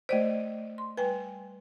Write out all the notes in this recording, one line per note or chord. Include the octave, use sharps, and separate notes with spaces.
A3 C5 D5 D#5
C6
G3 B4 G5 G#5